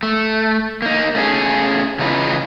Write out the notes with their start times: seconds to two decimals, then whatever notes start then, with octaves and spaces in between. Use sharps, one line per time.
0.03 A3
0.82 A#3 D#4
1.15 A3 C#4 G#4
1.99 C#3 E3 D#4 F4 B4